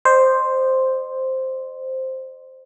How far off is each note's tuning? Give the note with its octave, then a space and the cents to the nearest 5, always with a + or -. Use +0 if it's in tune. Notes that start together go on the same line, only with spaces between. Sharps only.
C5 +0 D#5 -40